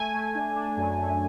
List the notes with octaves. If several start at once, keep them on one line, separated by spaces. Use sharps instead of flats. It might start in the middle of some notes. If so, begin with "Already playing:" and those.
Already playing: A3 G#5
A3
D4
D4
F#2
A3